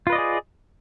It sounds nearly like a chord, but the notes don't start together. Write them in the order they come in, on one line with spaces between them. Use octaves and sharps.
F4 B4 D#5 D5 G#4